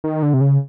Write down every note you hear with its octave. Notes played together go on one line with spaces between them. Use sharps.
D#3
D3
C3
C#3